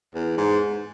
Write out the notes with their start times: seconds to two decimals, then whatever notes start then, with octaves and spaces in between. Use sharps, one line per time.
0.15 E2
0.38 G#2